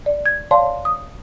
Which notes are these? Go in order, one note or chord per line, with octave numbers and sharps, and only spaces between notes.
D5
G#6
C#5 D5 F5 A5 C6
D#6